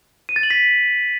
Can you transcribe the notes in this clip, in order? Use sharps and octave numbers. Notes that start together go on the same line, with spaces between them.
D#7
A6
F#7
B6